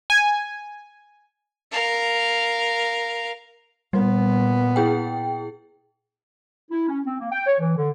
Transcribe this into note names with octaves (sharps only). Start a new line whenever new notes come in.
G#5
A#4 F5
A#2 G3 B3
E4 G#4 G5
E4
C#4
C4
A#3
G5
C#5
E3
D3